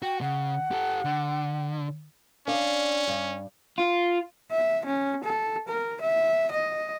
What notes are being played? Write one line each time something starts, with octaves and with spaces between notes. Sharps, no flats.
F#4 G5
C#3 F#5
G4 A4
D3
C#4 D4 D5 F5
G2
F4
E5
C#4
A4
A#4
E5
D#5